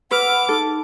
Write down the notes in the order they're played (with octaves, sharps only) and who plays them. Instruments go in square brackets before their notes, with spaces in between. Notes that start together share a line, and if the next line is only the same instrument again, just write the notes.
[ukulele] B4 [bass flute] F#5 [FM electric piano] B5 E6 F6 [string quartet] D6
[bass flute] D#4 [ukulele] A4